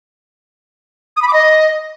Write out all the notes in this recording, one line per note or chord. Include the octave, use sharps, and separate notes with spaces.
D#6
B5
D6
D#5